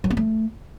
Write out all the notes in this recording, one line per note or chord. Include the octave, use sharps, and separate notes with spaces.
F#3
B3
A3